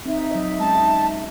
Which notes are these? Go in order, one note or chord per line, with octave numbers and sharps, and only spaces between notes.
C4 D#4 E5
F#3 D#5
G#3 C#4 A5